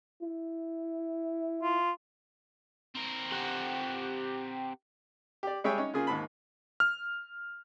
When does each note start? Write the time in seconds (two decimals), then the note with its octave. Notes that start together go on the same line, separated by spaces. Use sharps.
0.23 E4
1.63 F4
2.95 C4 A#4
3.32 G4 F#5
5.43 G4 D5
5.64 G3 G#3 G#4 C#5 E5 G5
5.78 C#4 D#4 C#5
5.93 C#3 A#3 F4 G#4
6.07 D#2 G#2 A5 B5
6.80 F6